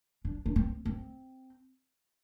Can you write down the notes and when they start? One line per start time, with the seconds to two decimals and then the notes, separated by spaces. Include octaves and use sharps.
0.25 D4
0.46 D4
0.56 C4
0.85 C4